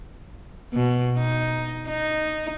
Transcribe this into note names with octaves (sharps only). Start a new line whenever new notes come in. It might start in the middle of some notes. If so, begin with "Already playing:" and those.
B2
D#4
D#4